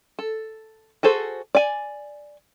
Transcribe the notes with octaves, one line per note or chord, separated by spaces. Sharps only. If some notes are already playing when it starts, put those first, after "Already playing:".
A4
F#4 G#4 A4 C5
D5 G#5